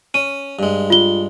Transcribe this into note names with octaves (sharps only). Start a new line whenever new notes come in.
C#4 D#7
G2 G#3
F4 G7